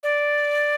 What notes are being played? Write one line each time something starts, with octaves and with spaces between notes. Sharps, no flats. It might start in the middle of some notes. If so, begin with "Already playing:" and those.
D5